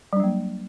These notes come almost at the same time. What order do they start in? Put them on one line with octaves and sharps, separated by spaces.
G3 D4 F#3 A#3